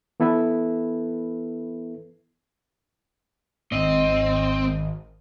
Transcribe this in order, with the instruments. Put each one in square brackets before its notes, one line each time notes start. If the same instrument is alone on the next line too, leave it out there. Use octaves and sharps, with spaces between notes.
[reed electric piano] E3 B3 E4 A4 B4 E5
[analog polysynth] G#1 [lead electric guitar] C4 [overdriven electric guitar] D#5